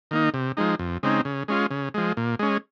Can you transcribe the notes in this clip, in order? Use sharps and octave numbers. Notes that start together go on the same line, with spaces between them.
D#3 A#3 D#4
C3
F3 G#3 D#4
F2
C#3 G#3 C4 D#4
C#3
G#3 C#4 F4
C#3
F3 G#3
A#2
G#3 C#4